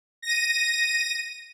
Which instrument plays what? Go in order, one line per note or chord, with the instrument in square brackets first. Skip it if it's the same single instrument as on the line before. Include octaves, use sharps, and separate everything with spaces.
[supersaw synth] A#6 D#7